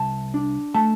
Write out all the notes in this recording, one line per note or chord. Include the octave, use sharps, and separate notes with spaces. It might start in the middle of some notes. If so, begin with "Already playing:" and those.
Already playing: C2 A5
D4
A3 A5